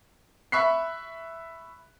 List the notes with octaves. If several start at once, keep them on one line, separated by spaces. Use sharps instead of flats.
E5 B5 C#6 F#6 B6 C7